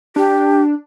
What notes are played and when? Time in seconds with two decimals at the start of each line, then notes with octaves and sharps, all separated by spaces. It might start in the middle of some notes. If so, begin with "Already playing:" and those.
0.16 D4 G4